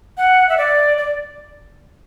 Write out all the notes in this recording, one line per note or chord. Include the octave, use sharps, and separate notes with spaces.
F#5
E5
D5
D5